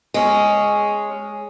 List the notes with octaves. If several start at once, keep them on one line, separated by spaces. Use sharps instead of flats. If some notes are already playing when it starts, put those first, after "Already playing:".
G#3 C#4